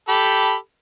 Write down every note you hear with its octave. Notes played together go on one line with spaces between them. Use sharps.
G4 A4 B5